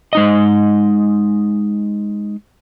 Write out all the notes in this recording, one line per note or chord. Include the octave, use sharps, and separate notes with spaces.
G#3 D#4 D#5